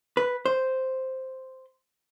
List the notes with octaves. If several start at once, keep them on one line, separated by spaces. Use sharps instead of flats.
B4
C5